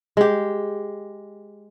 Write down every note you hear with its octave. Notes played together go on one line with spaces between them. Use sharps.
G#3 G4